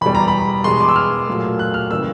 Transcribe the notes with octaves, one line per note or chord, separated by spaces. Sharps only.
E2 B2 G3 B5
A#5
B5
E2 B2 G#3 C6
D6
E6
F6
A#2 F#3 A3
F#6
F6
C#3 E3 G3 A#3 E6